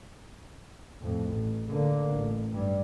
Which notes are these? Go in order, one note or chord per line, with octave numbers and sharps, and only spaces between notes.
F2 A2
A1
D3 A#3
A1
G2 G3